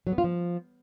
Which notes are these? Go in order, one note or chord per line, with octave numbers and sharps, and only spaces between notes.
F#3
B3
F4
F3